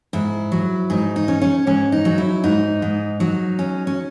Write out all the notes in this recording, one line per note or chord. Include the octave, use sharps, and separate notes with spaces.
G#2 E4
F#3
G#2 D#4
D#4
C#4
C#4
G#2 C#4
D#4
F#3
E4
G#2 D#4
G#2
F#3 D#4
C#4
C#4